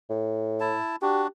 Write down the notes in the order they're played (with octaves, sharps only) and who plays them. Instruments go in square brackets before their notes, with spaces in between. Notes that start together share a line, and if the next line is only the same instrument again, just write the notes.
[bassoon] A2
[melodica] E4 A5
[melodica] D4 F#4 [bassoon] G4